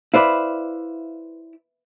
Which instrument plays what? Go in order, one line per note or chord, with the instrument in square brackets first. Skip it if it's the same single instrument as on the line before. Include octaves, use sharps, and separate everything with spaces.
[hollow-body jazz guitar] E4 C5 D5 [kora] B4 E5 F5